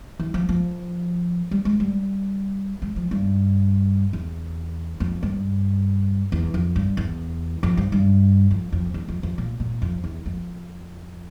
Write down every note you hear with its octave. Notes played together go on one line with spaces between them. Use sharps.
E3
F3
F3
G3
G#3
G3
G#3
F3
G2
E2
F2
G2
E2
F2
G2
E2
F2
G2
G2
F2
F2
E2
F2
F2
A#2
A#2
F2
E2
F2